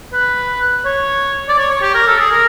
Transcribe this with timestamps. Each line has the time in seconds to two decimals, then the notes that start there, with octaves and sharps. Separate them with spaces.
0.13 B4
0.85 C#5
1.49 D5
1.58 C#5
1.70 C#5
1.82 G4
1.94 A#4
2.07 A4
2.19 G#4
2.31 A#4